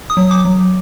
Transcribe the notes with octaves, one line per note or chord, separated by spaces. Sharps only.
D#6
F#3
D6
F#3